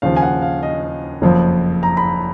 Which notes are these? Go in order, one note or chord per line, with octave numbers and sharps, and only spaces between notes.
D#2 C#3 F3 F5
G#5
F#5
F5
D#5
F#1 F2 F3
A#5
B5